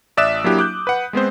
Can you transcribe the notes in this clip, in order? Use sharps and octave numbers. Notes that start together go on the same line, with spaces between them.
A1 D5 E5 D#6 F#6 E7
F#3 A#3 D4 E4 G4
D6 F#6 G6
B4 F#5
G#3 B3 C4 C5